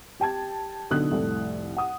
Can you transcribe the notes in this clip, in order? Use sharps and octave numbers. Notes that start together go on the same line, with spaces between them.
G4 G5 A5 G#6
B1 D3 D#4 A4 D#6 F#6
F1 C2 A2 A4
F#5 D#6